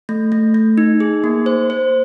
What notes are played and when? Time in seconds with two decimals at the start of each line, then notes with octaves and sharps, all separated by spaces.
0.09 A3
0.32 A3
0.54 A3
0.78 D#4
1.00 G#4
1.24 A#3
1.46 C5
1.70 C5